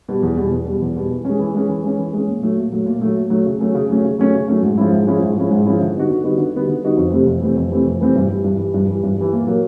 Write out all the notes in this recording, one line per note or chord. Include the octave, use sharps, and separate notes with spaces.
B2 G3
E2
B2 G3
E2
B2 G3
E2
B2 G3
E3
G#3 C#4
E3
G#3 C#4
E3
G#3 C#4
E3
G#3 C#4
A#2
F#3 A3
A#2
F#3 A3
A#2
F#3 A3
A#2
F#3 A3
C#3
F#3 A3 C#4
C#3
F#3 A3 C#4
C#3
F#3 A3 C#4
C#3
F#3 A3 C#4
G#2
F3 G#3 C#4 E4
G#2
F3 G#3 C#4 E4
G#2
F3 G#3 C#4 E4
G#2
F3 G#3 C#4 E4
D3
G3 B3 D#4 F#4
D3
G3 B3 D#4 F#4
D3
G3 B3 D#4 F#4
D3
G3 B3 D#4 F#4
F2
C3 E3 A3 C4
F2
C3 E3 A3 C4
F2
C3 E3 A3 C4
F2
C3 E3 A3 C4
G2
E3 G3
G2
E3 G3
G2
E3 G3
G2
E3 G3
A#2
F#3 A#3